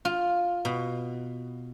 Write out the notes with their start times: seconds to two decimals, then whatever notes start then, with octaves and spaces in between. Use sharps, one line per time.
0.05 F4
0.65 B2